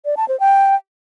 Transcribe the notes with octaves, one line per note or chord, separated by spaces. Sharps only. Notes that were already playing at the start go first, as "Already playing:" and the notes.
D5
A5
C5
G5